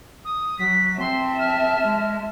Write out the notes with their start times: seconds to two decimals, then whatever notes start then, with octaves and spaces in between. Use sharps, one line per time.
0.25 D#6
0.59 F#3 B6
0.99 C4 E5 A5 C6
1.39 F6
1.83 G#3